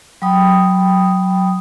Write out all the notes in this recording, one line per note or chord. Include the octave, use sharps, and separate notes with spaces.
F#3 G5 B5 D#6